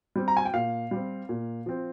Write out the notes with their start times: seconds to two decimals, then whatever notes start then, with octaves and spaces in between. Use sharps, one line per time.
0.16 G3 C4
0.28 A#5
0.37 G#5
0.45 G5
0.53 A#2 F5
0.91 G3 C4
1.29 A#2
1.66 F3 C4